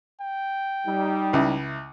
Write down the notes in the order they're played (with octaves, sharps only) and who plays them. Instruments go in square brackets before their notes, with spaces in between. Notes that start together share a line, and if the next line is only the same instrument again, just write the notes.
[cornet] G5
[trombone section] G3 D#4
[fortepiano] C#2 E4